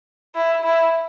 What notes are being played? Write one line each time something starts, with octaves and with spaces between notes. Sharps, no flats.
E4
E4